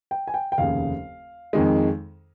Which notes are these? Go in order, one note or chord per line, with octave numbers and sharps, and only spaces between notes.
G5
G#5
G5
G5
F1 D#2 C#3 F5
F2 D#3 G#3